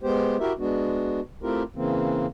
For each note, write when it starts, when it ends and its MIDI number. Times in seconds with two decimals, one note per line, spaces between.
0.03 0.37 56
0.03 0.37 59
0.03 0.37 67
0.03 0.37 72
0.40 0.53 64
0.40 0.53 66
0.40 0.53 67
0.40 0.53 70
0.40 0.53 76
0.59 1.21 56
0.59 1.21 59
0.59 1.21 62
0.59 1.21 66
1.43 1.63 57
1.43 1.63 60
1.43 1.63 64
1.43 1.63 65
1.43 1.63 67
1.43 1.63 70
1.76 2.26 49
1.76 2.26 52
1.76 2.26 58
1.76 2.26 60